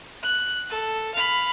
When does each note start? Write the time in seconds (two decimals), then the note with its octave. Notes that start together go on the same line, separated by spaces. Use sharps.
0.23 F#6
0.70 A4
1.15 F5 B5